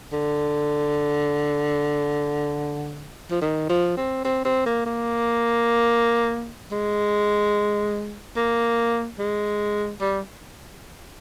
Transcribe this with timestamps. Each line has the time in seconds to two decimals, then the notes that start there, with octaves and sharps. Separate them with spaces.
0.12 D3
3.31 F3
3.42 D#3
3.69 F3
3.97 C4
4.25 C4
4.45 C4
4.66 A#3
4.86 A#3
6.71 G#3
8.37 A#3
9.19 G#3
10.01 G3